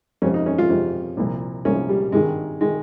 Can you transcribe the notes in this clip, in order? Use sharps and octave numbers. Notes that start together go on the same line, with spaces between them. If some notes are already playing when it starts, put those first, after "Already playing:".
F2 C3 F3 C#4
D#4
C#4
F4
F2 C3 F3
C2 A#2 F3
C2 A#2 F3 C#4
G3
G#1 G2 D#3 G#3
D#3 G#3